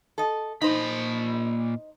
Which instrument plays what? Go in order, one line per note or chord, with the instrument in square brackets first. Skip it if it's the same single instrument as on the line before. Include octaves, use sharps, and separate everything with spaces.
[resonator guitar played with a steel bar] A4 D#5
[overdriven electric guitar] A#2 B5 [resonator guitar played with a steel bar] D#4 C5